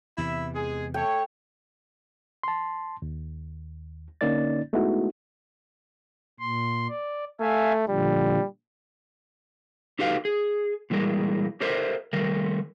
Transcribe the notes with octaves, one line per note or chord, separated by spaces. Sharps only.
E2 C3 E3 E4 E5
G#3 G#4
A3 A4 C#5 G5
A5 C6
D#2
D3 A#3 C#4 D#4 D5 A6
G#3 A3 B3 D#4 E4 F#4
A#2 C6
D5
A3 E5 F5 G#5
A#2 D3 F3 G3
D#4 F#4 G4 A4 B4 F5
G#4
A#2 E3 G3 G#3 A#4
G4 A4 A#4 C5 D#5 E5
D#3 G3 A3 A#4